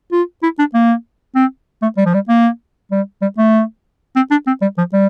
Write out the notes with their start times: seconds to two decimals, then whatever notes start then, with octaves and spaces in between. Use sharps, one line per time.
0.12 F4
0.43 E4
0.59 D4
0.74 A#3
1.35 C4
1.82 A3
1.97 G3
2.06 F3
2.14 G3
2.29 A#3
2.91 G3
3.22 G3
3.38 A3
4.16 C4
4.31 D4
4.47 C4
4.62 G3
4.78 F3
4.93 G3